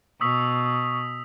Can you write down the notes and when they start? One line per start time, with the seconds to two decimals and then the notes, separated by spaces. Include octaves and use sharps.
0.21 B2 C#6 D#6 E6 B6